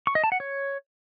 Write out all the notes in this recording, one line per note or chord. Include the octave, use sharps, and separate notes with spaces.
C#6
D#5
A5
F#5
C#5